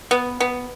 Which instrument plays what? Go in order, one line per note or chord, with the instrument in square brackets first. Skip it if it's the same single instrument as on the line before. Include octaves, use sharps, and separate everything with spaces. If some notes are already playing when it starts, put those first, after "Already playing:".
[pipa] B3
B3